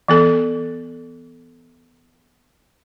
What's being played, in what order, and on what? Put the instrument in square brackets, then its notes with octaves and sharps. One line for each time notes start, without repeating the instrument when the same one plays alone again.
[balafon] E3 B3 A4